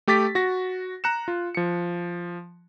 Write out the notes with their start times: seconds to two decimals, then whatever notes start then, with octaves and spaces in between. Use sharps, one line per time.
0.07 A3 G4 D6 A6 B6
0.35 F#4 A#6
1.04 A#5 F#6 C#7 E7
1.28 F4
1.55 F3 C#7